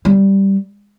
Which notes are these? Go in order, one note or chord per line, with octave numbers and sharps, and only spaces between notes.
G3